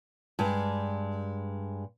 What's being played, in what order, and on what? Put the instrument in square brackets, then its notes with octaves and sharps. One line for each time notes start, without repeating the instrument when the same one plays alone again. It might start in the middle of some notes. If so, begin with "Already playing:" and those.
[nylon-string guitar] G2 G#3